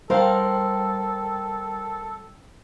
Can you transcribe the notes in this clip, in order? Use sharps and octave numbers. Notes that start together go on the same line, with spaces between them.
G3 A4 A#4 C5 F5 G5